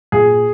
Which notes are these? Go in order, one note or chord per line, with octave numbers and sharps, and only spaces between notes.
A#2 G#4